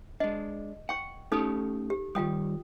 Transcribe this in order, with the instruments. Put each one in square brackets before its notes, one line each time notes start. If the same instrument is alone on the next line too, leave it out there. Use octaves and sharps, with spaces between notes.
[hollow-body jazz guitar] G#3 D4 [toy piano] D#5
[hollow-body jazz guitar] F#5 [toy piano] G5 C#6
[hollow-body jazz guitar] A3 C#4 G4 [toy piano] D#4 A4 D#6
[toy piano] G4
[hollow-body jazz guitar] D#3 G3 [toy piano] F4 G5 D#6